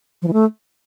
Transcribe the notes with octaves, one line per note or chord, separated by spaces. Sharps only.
F3
E3
A3